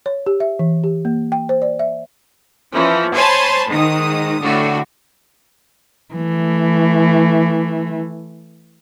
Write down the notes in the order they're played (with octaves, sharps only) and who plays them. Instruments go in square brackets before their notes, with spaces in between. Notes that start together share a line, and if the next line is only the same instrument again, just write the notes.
[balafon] C#5
G4
E5
E3
G4
A#3
G5
C5
D5
E5
[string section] E3 F3 C#4
C5 C#5 G#5 A5 B5 C6
G#2 D#3 D#6
A2 D3 F#4
[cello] E3 A3